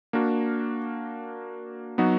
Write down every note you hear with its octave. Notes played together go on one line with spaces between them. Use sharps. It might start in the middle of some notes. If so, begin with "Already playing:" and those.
A#3 D4 F#4 A#4
F#3 B3 D#4 F#4 B4